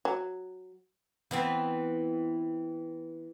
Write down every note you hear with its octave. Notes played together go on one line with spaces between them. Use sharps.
F#3
E3 B3 C4